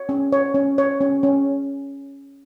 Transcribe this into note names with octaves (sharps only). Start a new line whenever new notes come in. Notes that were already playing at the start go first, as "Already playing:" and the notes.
Already playing: C#5
C#4
C#5
C#4
C#5
C#4
C#4